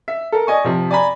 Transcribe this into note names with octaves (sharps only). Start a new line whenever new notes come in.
E5
A4 A#4
D5 D#5 G#5 C#6
C3 F3
D5 G#5 A#5 B5